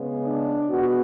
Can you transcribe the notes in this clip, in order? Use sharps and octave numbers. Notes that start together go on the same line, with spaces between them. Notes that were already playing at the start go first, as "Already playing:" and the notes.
Already playing: C#3 G#3 B3
D4
B2 G#3 B3 F#4